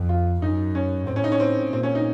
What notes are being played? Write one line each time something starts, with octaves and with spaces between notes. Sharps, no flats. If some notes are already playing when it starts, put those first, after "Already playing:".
Already playing: F2
F4
F#2 D#4
C#4
A2 C4
C#4
D#4
C#4
C4
A#2 C4
C#4
D#4